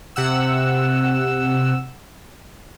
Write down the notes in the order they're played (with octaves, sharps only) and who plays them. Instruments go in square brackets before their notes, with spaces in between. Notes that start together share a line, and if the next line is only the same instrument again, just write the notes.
[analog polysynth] C3 F#5 E6